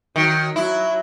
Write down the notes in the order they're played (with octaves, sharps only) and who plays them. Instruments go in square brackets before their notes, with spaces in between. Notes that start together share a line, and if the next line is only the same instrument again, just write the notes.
[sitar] D#3 [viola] F#3
[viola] F#3 [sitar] E4